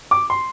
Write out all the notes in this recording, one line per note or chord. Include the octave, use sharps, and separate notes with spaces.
D6
C6